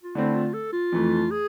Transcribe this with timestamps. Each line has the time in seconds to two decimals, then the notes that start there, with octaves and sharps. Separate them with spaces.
0.03 F4
0.15 D3 A3 C4 E4
0.35 F4
0.54 A4
0.73 F4
0.92 F2 E3 A3
1.31 G#4